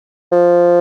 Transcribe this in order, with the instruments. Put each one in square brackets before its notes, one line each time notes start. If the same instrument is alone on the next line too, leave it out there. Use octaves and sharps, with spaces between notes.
[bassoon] F3